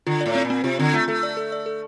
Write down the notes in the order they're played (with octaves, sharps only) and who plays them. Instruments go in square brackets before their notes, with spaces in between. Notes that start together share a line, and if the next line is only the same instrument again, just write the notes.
[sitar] D3 [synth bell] F4
[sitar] A2 [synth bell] D5
[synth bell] C4
[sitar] A#2
[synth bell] C4
[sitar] C3 [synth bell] F4
[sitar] D3 [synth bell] C4
[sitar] A3 [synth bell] F4
[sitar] A3 [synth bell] A4
[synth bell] D5
A4
D5
A4